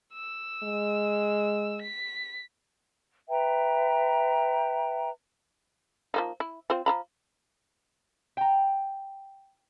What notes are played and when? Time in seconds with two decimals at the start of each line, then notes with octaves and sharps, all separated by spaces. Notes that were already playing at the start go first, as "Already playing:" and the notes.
0.13 E6
0.63 G#3
1.81 B6
3.29 B4 E5 G5 A#5
6.14 F3 A#3 D#4
6.40 E4
6.70 C4 F4 C5
6.86 F3 A#5 B5
8.37 G5 A#5